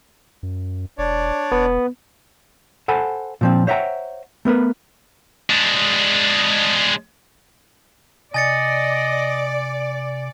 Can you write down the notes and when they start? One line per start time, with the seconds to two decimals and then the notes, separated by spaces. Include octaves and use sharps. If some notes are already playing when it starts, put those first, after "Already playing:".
0.43 F#2
0.98 E1 D4 C#5 D5
1.52 E1 B3
2.88 A4 C5 F#5 G#5 A5 B5
3.41 A#2 F3 C4
3.67 C5 C#5 E5 F#5 G5 A#5
4.45 A3 B3 A#4 B4
5.50 G#3 D4
8.34 C3 D5 D#5 G#5 A6 C#7